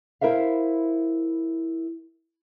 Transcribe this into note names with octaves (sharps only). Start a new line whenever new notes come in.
E4 A#4 C5 E5 F5